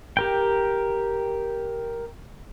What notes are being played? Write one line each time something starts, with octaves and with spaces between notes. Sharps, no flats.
G4 A#4 G5